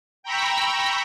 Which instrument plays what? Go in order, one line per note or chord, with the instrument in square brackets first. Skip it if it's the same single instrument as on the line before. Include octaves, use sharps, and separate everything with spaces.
[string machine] G5 A#5 B5 C#6 E6 B6